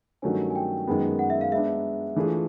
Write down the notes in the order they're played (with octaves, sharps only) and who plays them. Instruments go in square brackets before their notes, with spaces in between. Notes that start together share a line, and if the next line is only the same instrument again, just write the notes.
[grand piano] G2 D#3 F#3 A3 C#4 [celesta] G#5
[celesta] G#5
G5
[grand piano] F#2 D#3 G#3 B3 D#4
[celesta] F#5
E5
F5
[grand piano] G#3 B3 D4 [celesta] E5
[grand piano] E3 A3 D4 F4 G#4